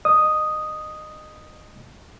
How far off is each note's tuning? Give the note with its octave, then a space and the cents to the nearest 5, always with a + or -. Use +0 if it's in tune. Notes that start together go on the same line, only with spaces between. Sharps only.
D#5 -25 D#6 +0